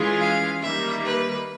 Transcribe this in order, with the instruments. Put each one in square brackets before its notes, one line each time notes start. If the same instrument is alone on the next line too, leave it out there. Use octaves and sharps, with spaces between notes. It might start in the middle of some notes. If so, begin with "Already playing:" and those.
Already playing: [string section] E3 G#3 C#4 F4 G#4
[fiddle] F5
[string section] D#3 G3 A#3 [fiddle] E5
[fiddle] B4